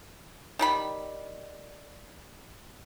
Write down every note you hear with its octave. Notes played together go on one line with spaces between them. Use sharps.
D#3 G3 B5